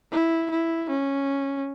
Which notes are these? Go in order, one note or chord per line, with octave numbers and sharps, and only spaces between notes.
E4
E4
C#4